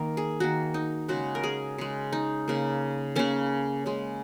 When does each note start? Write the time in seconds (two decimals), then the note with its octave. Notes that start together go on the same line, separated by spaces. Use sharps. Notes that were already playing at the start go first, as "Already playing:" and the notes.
Already playing: D#3 A#3 A#4
0.17 G#4
0.40 D#3 A#3 F#4
0.74 D#4
1.08 C#3 G#3 F#4
1.35 A#4
1.43 G#4
1.78 C#3 G#3
2.13 D#4
2.48 C#3 A#3
3.16 C#3 A#3 C#4
3.86 C#3 G#3